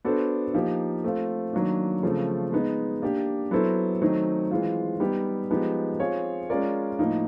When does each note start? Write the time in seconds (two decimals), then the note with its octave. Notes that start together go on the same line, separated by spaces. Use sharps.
0.04 B3 D4 F#4 A4 C5
0.54 F3 A#3 D#4 G4
1.04 A3 C4 F4
1.53 D#3 F#3 A#3 D4
2.03 C#3 F3 A3 C4
2.52 G#3 B3 D#4
3.02 A#3 D4 G4
3.51 F#3 B3 E4 A4 C5
4.02 D#3 F#3 A3 C4 D#4
4.51 E3 G#3 C4 F4
5.00 G3 B3 D#4 G4
5.51 F3 G#3 B3 D#4 G4
5.99 C4 F4 G#4 C#5
6.50 G#3 C#4 F4 A#4 D5
6.99 A2 F3 A#3 D#4